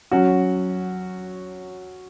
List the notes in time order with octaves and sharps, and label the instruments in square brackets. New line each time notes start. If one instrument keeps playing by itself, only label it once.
[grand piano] F#3 C#4 F#4